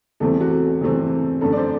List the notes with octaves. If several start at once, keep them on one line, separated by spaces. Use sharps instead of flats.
E2 C3 E3 A3 C4 A4
F#4
E2 C3 E3 A3 C4
F#2 D3 A3 A4
D5
C5